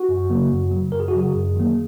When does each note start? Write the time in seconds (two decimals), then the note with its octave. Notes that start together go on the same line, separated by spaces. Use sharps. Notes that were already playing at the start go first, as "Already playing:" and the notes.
Already playing: F#4
0.09 F#2
0.30 C#3 F#3 A#3
0.51 F#2
0.71 C#3 F#3
0.92 F#2 A#4
1.00 G#4
1.08 F#4
1.14 C#3 F#3 G#4
1.34 F#2
1.56 D#3 F#3 A#3